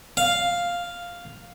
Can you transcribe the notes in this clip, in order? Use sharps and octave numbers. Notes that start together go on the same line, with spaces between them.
F5